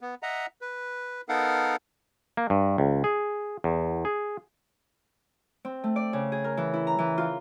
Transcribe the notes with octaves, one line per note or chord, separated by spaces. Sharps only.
B3
D#5 E5 F#5 A#5
B4
B3 D#4 A4 A#4 F5 F#5
A#3
G2
C#2
G#4
E2
G#4
C4
A3
D5
C#3
G#4
A#4
E3
E4
A#5
E3
F4